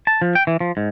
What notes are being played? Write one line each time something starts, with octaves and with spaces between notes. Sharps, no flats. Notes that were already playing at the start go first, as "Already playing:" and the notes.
A5
F3
G5
E3
F3
G#2